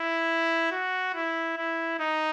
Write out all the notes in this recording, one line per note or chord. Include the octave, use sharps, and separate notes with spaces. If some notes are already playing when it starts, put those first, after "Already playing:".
Already playing: E4
F#4
E4
E4
D#4